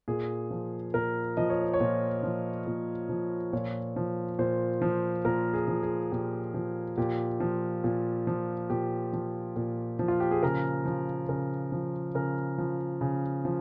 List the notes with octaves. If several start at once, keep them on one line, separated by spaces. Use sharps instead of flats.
A#2 G#4
F3
A#2 A#4
F3 D#5
C#5
C5
C#5
A#2
F3
A#2
F3
A#2 C#5
F3
A#2 C5
F3
A#2 A#4
G#4
F3
G#4
A#2 G4
F3
A#2 G4
F3
A#2
F3
A#2 G4
F3
A#2
F3
F4
G4
G#4
C#3 A#4
F3
C#3 A#4
F3
C#3 A#4
F3
C#3
F3